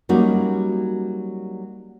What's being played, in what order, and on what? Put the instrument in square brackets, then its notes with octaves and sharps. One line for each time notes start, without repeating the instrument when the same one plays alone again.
[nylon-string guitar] F#3 G3 A#3 C#4 D#4 F#4